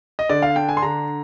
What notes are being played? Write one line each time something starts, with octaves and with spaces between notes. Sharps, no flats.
D#5
D3 D5
F5
D4 G5
G#5
C6
D3 A#5